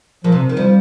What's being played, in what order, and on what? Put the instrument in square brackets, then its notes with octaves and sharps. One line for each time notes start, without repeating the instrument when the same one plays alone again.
[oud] A#2 [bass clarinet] F3
[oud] C3
D#3
[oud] F3 [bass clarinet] G3